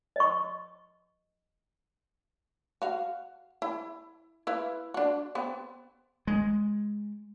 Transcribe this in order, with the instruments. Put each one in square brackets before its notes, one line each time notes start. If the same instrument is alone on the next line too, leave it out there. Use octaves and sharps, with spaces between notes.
[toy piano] D#5 C#6
[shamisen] F#4 F5
E4
E4 B4 F5
D4 F#4
B3 C4
[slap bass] G#3